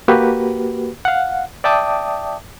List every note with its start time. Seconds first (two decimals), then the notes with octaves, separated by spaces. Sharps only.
0.08 A#3 F#4 G4 B4
1.05 F5 F#5
1.64 D5 E5 G5 A5 D6 D#6